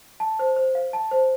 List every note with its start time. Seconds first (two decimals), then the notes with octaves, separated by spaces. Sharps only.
0.20 A5
0.39 C5
0.56 C5
0.75 F5
0.93 A5
1.11 C5